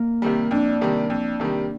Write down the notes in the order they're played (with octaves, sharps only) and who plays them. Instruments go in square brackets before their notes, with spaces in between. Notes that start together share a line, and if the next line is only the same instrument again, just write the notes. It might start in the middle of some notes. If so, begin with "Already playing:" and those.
Already playing: [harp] A#3
[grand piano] C3 D#3 G3
[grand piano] F2 [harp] D4
[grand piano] C3 D#3 G3
F2
C3 D#3 G3